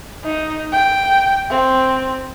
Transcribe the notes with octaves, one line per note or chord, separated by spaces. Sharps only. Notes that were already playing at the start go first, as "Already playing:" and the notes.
D#4
G5
C4